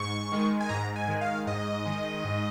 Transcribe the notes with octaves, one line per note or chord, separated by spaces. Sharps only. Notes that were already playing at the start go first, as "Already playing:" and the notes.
Already playing: G#2 C#6
D#3 G#3
G#5
G#2 A#5
G#5
D#3 G#3
F5
G#2 D#5
D#3 G#3
G#2